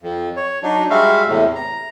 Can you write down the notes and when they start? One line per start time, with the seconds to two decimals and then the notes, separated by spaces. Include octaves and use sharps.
0.02 F2
0.36 C#5
0.63 F#3 D4 D#4
0.90 G3 G#3 F#4 E5 F5
1.28 E2 A2 C3
1.55 A#5